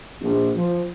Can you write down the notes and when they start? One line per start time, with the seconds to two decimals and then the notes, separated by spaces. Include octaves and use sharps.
0.21 A#1
0.56 F3